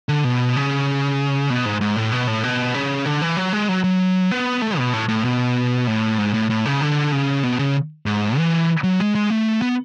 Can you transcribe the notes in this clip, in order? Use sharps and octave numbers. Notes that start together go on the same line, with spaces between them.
D3
B2
C#3
B2
G#2
G#2
A2
B2
A2
B2
C#3
D3
E3
F#3
G#3
F#3
F#3
B3
A3
B2
A2
A2
B2
A2
G#2
A2
A2
C#3
D3
C#3
B2
C#3
G#2
E3
F#3
G#3
G#3
A3
B3